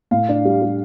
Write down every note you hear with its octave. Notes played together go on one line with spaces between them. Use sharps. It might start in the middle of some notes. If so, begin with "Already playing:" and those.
A2 F5
D4
G3
G3